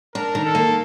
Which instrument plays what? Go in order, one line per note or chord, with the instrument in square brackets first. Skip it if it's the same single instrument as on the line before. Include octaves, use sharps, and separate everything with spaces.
[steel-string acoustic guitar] D4 [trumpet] A#4
[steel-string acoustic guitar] D#3
[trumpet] A4
[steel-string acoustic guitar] A#3